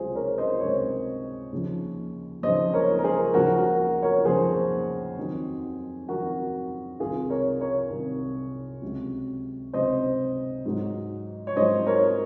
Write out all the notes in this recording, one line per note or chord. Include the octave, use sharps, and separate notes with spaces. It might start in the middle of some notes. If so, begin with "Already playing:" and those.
Already playing: C#2 C3 F#3 F4 G#4 C5
A#4 C#5
C5 D#5
C#2 C3 F#3 A#4 C#5
D#2 C#3 F3
D#2 C#3 F3 C5 D#5
A#4 C#5
A#4
G#4 C5
D#2 C#3 F3 F#4 A#4
F#4 A#4
A#4 C#5
D#2 C#3 F3 G#4 C5
F2 D#3 F#3
F2 D#3 F#3 F#4 A#4
C2 C3 D#3 F4 G#4
A#4 C#5
A#4 C#5
C2 C3 D#3
C#2 C3 F#3
C#2 C3 F#3 C5 D#5
G#2 F#3
C#5
G#2 F#3 C5 D#5
A#4 C#5